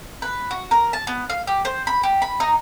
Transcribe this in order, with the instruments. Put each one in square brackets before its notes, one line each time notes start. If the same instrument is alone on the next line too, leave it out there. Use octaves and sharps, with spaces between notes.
[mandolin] B4
F#4
A#4
A5
B3
F5
G4
C5
B5
G4
B5
D#4